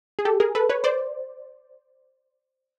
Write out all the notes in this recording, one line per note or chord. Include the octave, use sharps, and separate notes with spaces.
G#4
G4 A4
G#4 A#4
A4 B4
B4 C#5
C5 D5